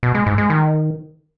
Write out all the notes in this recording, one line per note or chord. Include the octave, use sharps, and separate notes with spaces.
B2
G#3
G#2
G#3
D#3